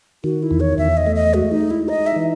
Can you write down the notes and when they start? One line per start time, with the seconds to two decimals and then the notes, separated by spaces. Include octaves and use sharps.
0.24 D#3 F#4
0.43 E4
0.51 E2
0.60 C#5
0.78 E2 E5
0.97 D#5
1.07 A3
1.16 D#5
1.34 G#3 F#4
1.52 D#4
1.61 G#3
1.71 E4
1.88 D#4 D#5
2.06 E5
2.16 E3